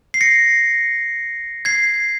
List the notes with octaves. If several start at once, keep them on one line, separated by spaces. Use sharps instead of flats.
C7
A#6 C#7
G#6 C7